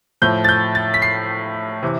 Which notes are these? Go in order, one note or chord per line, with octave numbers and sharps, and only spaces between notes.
A2 F3 G6
A6
G6
A6
B6
C7
C3 E3